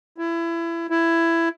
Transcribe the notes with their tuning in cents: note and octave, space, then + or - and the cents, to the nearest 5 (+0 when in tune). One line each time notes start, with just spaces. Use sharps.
E4 +25
E4 +15